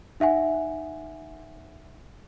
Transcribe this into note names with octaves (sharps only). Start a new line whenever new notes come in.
D#4 E5 F#5 G#5